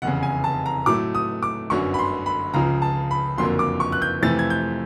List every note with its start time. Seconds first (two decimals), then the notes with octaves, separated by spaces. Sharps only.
0.02 F1 E2 C#3 F#5
0.23 G#5
0.44 A5
0.66 A#5
0.86 A2 F#3 A3 D6
1.15 D#6
1.43 D6
1.70 G1 F#2 D3 F#3 C#6
1.94 B5
1.99 C6
2.26 B5
2.54 C#2 C#3 F3 A#5
2.82 A5
3.11 B5
3.38 F#1 F2 D3 F#3 A#3 C6
3.59 D6
3.80 C#6
3.92 F#6
4.02 G6
4.22 F2 C3 E3 A3 C4 A6
4.39 G#6
4.50 G6